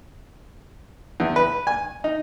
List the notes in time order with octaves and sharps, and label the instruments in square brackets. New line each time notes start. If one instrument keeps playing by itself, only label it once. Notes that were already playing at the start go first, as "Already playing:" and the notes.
[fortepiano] E2
B4
G#5
D#4